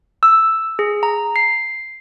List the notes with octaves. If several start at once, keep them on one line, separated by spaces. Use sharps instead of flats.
E6
G#4
A#5
C7